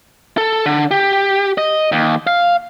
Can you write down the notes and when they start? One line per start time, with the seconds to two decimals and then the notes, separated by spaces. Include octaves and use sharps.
0.38 A4
0.66 D3
0.91 G4
1.58 D#5
1.92 D#2
2.27 F5